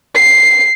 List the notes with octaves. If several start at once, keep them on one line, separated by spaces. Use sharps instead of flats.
C7